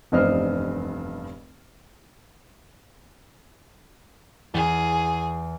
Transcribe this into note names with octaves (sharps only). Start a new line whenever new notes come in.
F1 E2 G2 C5 D#5 F6
E2 G#4 A6